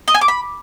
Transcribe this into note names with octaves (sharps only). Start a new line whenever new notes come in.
D#5
G#5
D6
B5